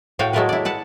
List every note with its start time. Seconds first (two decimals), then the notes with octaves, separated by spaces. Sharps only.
0.19 A2 F#4 F5 G5
0.33 F#3 G#3 A3 F4 A#4 B4
0.49 E4 D5
0.65 B4 F#5 A5